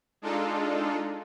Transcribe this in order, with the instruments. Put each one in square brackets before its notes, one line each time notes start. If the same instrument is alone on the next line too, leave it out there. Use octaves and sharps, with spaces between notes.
[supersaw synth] G#3 D4 D#4 F4 A4